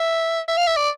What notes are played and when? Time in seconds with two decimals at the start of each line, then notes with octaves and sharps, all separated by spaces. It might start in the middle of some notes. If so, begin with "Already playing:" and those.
Already playing: E5
0.48 E5
0.57 F5
0.67 E5
0.77 D5